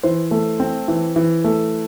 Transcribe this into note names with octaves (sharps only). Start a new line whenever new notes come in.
E3 C5
A3
C4
E3
E3
A3